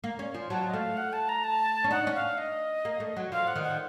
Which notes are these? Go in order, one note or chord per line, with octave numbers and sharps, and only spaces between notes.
A#3
C#4
F3
F#3 A5
D#5
A3 F5
F#5
A5
A#5
A5
C#4
D#4 F#5
C#4
F5
D#5
A#3
A3
F#3
F3 F5
F#5
D#3
F#5